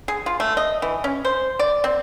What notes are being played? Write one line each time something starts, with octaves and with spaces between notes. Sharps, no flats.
G#4
F4
A3
D#5
E3
C#4
C5
D5
C4